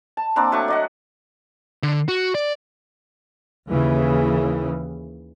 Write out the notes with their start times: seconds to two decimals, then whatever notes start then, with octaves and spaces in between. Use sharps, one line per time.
0.17 A5
0.36 A#3 C4 D4
0.52 F#3 A3 D4 C#6
0.68 D5 D#5 F#5
1.83 D3
2.08 F#4
2.35 D5
3.70 D#2 C#3 E3